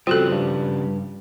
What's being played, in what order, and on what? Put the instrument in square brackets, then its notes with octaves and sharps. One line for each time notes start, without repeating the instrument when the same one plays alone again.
[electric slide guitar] C#3 F3 G3 [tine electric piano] C4 F#6 [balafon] F4 F#4 A4
[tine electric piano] G2